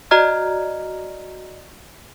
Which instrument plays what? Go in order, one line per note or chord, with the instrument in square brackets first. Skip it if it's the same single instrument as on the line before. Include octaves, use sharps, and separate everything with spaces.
[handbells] F#4 D5 D#5 A#5 F6 G#6